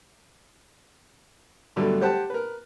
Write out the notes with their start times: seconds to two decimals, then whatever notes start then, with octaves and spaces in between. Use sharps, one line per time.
1.76 G2 B2 D3 F#3 A3
2.01 G4 C5 F#5 G5 A5
2.30 A#4 B4